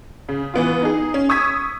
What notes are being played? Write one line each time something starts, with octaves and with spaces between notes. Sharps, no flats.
C#3
E3 B3 F4
D#4 G#4
C#4
C#6 D#6 E6 G#6 B6